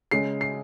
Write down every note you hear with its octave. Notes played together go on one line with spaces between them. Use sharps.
C#3 G#3 C7
C7